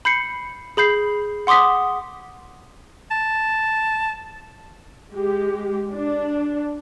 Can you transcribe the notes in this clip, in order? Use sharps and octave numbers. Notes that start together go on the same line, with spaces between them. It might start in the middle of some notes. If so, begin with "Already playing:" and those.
B5 G6 C7 C#7
G#4 B5 G6 C7
F#5 C6 D6 D#6 B6
A5
G#3 G4
D4